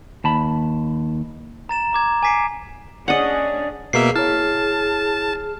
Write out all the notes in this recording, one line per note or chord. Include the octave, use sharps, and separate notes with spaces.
D#2 A5 B5
A#5 A6 E7
A#5 D6 G#6
G#5 D6 B6 C7 D7
C#4 D4 G#4 D5 D#5 F#5
B2 A#3 G#4 E5 C7
E4 C#5 A5 F6